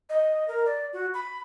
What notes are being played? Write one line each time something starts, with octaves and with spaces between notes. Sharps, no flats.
D#5
A#4
D5
F#4
B5